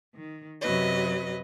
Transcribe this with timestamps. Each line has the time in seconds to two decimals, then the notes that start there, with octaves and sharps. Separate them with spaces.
0.15 D#3
0.62 F#2 C3 F#3 B4 D#5